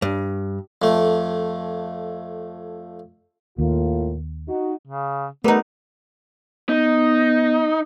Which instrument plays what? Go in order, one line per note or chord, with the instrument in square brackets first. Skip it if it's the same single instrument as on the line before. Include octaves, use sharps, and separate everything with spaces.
[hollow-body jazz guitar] G2
[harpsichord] F2 A3
[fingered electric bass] D#2 [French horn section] A2 A#3 F4
[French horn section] D#4 F#4
[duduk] C#3
[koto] G3 D#4 [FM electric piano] A3 A#4 B4 [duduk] B3
[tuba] B3 [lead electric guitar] D#4